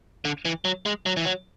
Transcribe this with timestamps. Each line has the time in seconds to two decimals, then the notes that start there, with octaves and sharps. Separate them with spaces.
0.25 D3
0.45 E3
0.65 F#3
0.86 G#3
1.06 F#3
1.17 E3
1.25 F#3